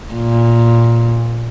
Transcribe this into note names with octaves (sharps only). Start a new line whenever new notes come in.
A#2